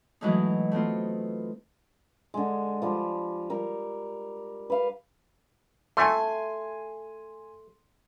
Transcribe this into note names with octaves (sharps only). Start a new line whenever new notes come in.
E3 F#3 G#3 A3 D#4
A3 B3 C4 F4
D3 G#3
F3 G3 D#5
G3 A#4
B4 F5
A3 G#5 C6